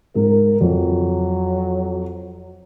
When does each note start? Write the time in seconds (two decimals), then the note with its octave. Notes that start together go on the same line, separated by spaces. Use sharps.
0.15 G#2 A#4
0.61 F2 F#3